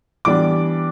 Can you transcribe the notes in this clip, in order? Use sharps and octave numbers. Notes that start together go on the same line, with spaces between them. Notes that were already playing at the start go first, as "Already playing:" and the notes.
E3 G3 B3 D4 D6